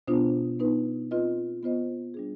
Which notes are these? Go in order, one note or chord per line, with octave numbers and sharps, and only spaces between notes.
B2 B3 D4 F4 C5
B3 D#4 B4
C4 F4 B4 D#5
B3 F4 C5 D#5
G3 D4 G#4